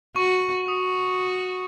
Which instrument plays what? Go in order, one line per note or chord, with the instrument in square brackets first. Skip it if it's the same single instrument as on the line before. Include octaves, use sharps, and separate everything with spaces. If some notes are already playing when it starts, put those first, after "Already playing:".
[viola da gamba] F#4 [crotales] C#6
[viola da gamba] F#4 [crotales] D#6